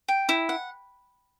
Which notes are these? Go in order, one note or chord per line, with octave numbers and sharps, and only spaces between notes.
G5
E4
F#5